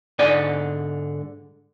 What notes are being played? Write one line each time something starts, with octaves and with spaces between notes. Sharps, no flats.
G#2 D3 D5 G#5